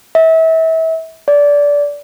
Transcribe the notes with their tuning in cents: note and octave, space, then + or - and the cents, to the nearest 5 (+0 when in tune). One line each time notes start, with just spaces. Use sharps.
E5 -30
D5 -20